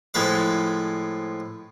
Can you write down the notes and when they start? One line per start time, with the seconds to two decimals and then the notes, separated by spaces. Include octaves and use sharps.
0.14 A2 F3 G#3 B4 F5